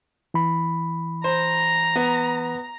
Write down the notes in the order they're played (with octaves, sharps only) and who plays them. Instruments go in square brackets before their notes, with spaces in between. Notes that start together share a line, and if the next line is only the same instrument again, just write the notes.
[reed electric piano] E3 B5
[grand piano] C5 [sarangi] A#5
[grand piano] B3